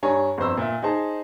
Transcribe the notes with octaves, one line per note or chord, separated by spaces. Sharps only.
G2 D4 C#5 G#5 A#5
G1 F2 C5 E6
A#2 E5
D#4 G#4 C5 A5